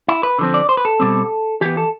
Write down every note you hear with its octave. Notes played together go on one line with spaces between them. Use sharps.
E4
B4
D3 F3 C4
D5
C5
B4
A4
B2 G3 C4
E3 B3 G4
A4